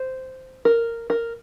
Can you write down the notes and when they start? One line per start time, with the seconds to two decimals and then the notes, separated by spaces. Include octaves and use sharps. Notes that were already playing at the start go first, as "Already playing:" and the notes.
Already playing: C5
0.65 A#4
1.10 A#4